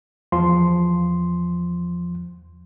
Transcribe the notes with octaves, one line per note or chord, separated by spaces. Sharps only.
E2 F3 C6